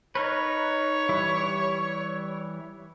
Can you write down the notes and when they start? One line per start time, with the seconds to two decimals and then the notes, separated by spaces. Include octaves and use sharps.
0.15 D#4 A#4 B4 C#5
1.09 E3 G3 E4